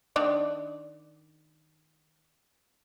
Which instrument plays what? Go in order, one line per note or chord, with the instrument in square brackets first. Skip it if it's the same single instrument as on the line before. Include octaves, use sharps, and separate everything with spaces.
[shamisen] D#3 D4 D5